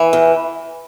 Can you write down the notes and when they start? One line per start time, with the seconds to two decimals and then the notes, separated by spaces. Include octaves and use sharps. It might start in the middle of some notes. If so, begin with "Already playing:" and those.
Already playing: E3
0.13 E2